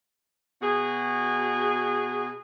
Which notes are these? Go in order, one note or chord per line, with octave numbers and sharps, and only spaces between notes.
B2 F#4 G#4